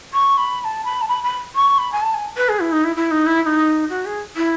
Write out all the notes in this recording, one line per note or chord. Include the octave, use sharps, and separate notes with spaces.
C#6
B5
B5
A5
B5
A5
B5
B5
C#6
B5
G#5
A5
G#5
B4
G#4
E4
D#4
E4
E4
D#4
E4
E4
D#4
F#4
G#4
E4